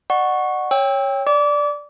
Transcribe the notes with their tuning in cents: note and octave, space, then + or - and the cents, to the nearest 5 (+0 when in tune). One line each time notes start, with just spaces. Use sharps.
D5 +40 F#5 +0 C#6 +0
C#5 +0 G5 +20 E6 -15
D5 +0 D6 -25